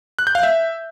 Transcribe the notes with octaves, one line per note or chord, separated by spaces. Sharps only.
F#6
G6
F5
E5